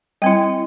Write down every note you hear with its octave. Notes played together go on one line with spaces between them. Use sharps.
G3 C4 E4 G5